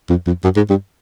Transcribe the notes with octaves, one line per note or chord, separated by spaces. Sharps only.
F2
F2
F#2
G#2
G2